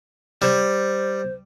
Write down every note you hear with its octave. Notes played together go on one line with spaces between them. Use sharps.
G3 C5